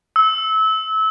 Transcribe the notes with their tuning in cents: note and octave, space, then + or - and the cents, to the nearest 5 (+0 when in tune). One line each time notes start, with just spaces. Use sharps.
E6 -25